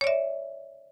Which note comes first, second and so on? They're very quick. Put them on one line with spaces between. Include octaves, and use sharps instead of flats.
C#5 D5 E5